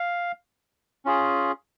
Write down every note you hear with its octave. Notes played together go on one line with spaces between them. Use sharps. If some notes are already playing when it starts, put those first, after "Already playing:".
Already playing: F5
C#4 F4 G#4